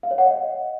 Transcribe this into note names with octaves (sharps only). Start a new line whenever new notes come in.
F5
C#5
F#5
D#5